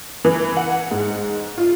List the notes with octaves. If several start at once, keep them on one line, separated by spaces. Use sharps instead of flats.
E3
F#5
G#2
F4